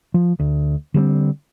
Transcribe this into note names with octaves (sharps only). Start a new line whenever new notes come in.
F3
D2
D3 G3 A#3 C4